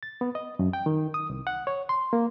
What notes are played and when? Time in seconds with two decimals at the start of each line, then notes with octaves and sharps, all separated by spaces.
0.03 A6
0.21 B3
0.35 D#5
0.59 F#2
0.73 G5
0.86 D#3
1.14 D#6
1.30 C2
1.47 F#5
1.67 C#5
1.89 C6
2.13 A#3